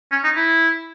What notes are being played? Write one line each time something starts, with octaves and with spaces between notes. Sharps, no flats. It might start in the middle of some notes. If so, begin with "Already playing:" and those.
C#4
D#4
E4